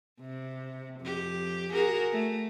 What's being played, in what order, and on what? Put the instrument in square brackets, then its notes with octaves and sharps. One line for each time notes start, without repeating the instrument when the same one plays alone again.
[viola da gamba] C3
F2 G4
F#4 G#4 A#4
A3